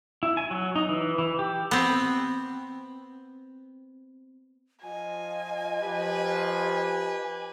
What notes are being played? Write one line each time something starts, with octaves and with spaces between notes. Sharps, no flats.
E4
G#5
F#3
D#4
E3
E3
G4
B3 C4
F3 F4 D#5 G#5
F3 G4 B4